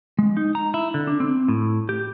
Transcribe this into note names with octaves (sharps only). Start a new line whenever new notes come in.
G#3
D#4
A#5
E4
D3
D4
C4
A2
G4